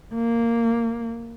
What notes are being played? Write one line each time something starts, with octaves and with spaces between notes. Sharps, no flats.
A#3